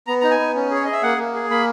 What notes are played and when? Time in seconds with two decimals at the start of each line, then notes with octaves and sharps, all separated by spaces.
0.07 B3 A#5
0.21 D#4 A#5
0.31 G#5
0.40 B3
0.55 C#4
0.71 G#4 C#5
0.84 G#4 D#5
0.93 E5
1.03 A#3 F#5
1.18 A#3
1.35 G#4
1.50 A#3 B5